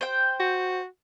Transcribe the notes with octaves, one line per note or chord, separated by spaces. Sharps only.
C5 G5
F#4